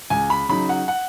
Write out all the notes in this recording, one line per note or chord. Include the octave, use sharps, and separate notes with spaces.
C#2 G#5
B5
C#3 F#3 D#4 B5
F#5
F#5